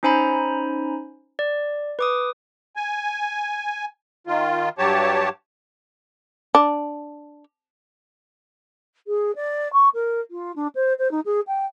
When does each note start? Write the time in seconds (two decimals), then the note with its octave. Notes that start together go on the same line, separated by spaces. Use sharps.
0.03 C#4 D#4 C5 G#5 A#5 B5
1.39 D5
1.99 B4 D6 D#6
2.76 G#5
4.27 D#3 F4
4.78 G2 F#3 G4 C#5 A5
6.55 D4
9.07 G#4
9.35 D5
9.73 C#6
9.94 A#4
10.30 F4
10.55 D4
10.75 C5
10.98 C5
11.11 D#4
11.25 G#4
11.47 G5